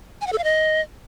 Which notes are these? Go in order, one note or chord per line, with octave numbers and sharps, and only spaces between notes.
G#5
F#5
A4
F5
D#5